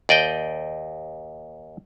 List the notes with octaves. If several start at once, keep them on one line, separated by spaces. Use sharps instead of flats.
D#2 D5 D#5 G5